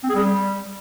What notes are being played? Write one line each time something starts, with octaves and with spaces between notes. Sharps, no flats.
C4
G#4
G3